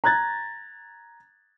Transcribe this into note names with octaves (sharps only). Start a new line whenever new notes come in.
A#5 F#6 G#6 A6